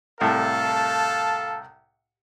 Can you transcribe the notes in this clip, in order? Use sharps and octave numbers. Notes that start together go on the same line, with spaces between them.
C2 A2 A4 F5 A5